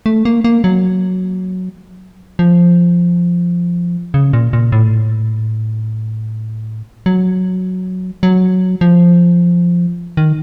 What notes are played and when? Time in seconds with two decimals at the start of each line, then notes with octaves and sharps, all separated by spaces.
0.06 A3
0.25 A#3
0.44 A#3
0.64 F#3
2.39 F3
4.14 C#3
4.33 A#2
4.53 A#2
4.72 A2
7.06 F#3
8.23 F#3
8.81 F3
10.17 D#3